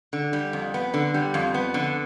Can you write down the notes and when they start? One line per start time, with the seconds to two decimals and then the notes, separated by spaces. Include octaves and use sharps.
0.13 D3
0.33 G3
0.53 F2
0.74 B3
0.94 D3
1.14 G3
1.34 F2
1.54 B3
1.74 D3